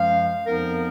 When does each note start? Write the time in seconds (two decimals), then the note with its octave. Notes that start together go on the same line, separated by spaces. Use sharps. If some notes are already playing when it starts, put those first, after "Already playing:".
Already playing: F#2 F3 G#3 F5
0.47 F2 F3 B3 D#4 A#4